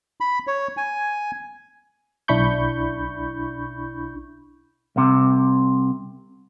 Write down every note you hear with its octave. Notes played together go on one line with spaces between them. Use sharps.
B5
C#5
G#5
B1 D4 E4 B5 C#6 G6
C2 C3